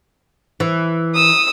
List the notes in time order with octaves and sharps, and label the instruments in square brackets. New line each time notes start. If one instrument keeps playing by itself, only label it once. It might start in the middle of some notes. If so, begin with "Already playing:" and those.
[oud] E3
[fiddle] D#6 E6